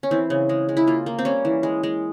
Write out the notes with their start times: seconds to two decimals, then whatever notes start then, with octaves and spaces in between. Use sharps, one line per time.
0.03 C#4
0.11 E3 C4
0.30 C#3
0.49 G#3
0.69 G#3
0.77 E4
0.87 A#3 F4
1.06 A#3
1.19 C4
1.25 G3 C#4
1.45 E3
1.63 G#3
1.83 G#3